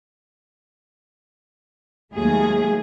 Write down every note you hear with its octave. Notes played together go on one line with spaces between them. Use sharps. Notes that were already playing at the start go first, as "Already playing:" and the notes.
D#2 F#3 G#3 A3 G#4